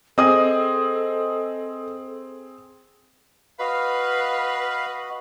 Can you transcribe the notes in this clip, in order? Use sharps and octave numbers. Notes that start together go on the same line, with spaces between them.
C4 G#4 A4 D#5 D#6
F#4 B4 D#5 F5 B5